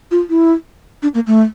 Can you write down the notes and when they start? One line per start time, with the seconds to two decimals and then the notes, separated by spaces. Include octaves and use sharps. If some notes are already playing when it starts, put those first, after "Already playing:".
0.11 F4
0.30 E4
1.03 D4
1.15 A#3
1.27 A3